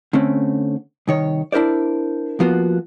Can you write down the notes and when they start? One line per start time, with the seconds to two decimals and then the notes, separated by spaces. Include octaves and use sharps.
0.13 D3 A3 C4 C#4
1.08 C2 D#3 C#5
1.52 D4 E4 A#4 C5 D5
2.40 F3 A#3 B3 F4 F#4